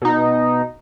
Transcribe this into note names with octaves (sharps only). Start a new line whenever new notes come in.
B2 D#4